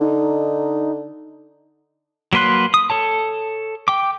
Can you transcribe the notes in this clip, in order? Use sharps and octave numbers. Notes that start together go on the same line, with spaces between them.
D3 D#4
F#3 A#3 B4 C6 F#6
D#6
A4 C#5 A5
G5 D6